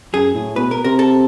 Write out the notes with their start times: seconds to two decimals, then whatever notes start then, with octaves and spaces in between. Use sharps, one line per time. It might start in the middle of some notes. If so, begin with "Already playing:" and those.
0.14 F#2 G#4
0.35 A2
0.56 B2 B4
0.71 A#4
0.84 C3 A#4
0.99 A4